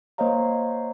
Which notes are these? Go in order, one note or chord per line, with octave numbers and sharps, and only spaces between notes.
A#3 C5 C#5 D#5 F5 A#5